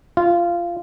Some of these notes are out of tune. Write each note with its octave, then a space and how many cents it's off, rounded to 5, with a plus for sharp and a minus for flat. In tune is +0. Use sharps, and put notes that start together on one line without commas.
F4 -15